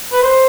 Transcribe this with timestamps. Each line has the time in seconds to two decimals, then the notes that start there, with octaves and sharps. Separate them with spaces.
0.13 B4
0.22 C5